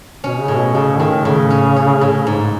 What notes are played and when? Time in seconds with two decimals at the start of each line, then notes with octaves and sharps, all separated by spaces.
0.24 B2 C#4
0.41 C#3
0.48 A2
0.57 B2
0.75 A2 C#3
0.99 A2 D#3
1.25 A2 C#3
1.50 C#4
1.76 C#4
2.01 A2
2.27 G#2